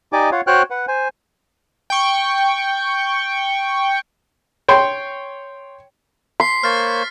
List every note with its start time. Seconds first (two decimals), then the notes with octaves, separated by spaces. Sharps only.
0.13 D#4 G4 D5 D#5 G#5 D6
0.32 F4 C#5 F5 F#5
0.47 F#4 C5 C#5 G5 F6 F#6
0.70 B4 F#5
0.88 C5 G#5
1.90 G5 C#6
4.68 C#5 G5 C6
6.40 C6 B6 C7
6.64 A#3 C5 C#5 F6 A6